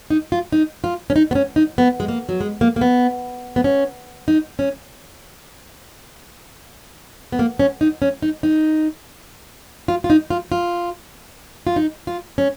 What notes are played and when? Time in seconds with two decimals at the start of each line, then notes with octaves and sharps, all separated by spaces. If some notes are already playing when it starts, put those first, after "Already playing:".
0.10 D#4
0.32 F4
0.52 D#4
0.84 F4
1.10 C#4
1.16 D#4
1.31 B3
1.35 C#4
1.56 D#4
1.78 B3
2.00 G#3
2.08 A#3
2.29 F#3
2.41 G#3
2.61 A#3
2.76 A#3
2.81 B3
3.56 B3
3.64 C#4
4.28 D#4
4.59 C#4
7.32 B3
7.39 A#3
7.59 C#4
7.81 D#4
8.02 C#4
8.22 D#4
8.43 D#4
9.88 F4
10.04 F4
10.10 D#4
10.30 F4
10.52 F4
11.67 F4
11.76 D#4
12.07 F4
12.38 C#4